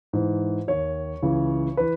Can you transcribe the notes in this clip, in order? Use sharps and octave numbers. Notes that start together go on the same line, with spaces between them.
G#2 E3
D#2 D#3 C#5
C#2 C#3 E3
E3 B4